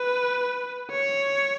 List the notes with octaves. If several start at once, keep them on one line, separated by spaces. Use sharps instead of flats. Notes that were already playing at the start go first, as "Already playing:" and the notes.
Already playing: B4
C#5